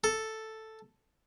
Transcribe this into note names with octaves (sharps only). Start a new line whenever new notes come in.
A4